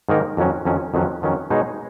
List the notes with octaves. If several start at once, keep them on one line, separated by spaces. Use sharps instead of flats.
G#2 D#3 A#3 D#4 A#4
F2 D#3 F#3 C#4
F2 D#3 F#3 C#4
F2 D#3 F#3 C#4
F2 D#3 F#3 C#4
B2 G#3 D#4 G#4 C#5